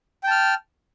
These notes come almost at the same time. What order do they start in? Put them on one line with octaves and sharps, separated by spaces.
G5 A5 F6